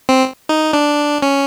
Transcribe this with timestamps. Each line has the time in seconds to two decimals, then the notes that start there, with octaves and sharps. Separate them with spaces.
0.09 C4
0.49 D#4
0.73 D4
1.22 C#4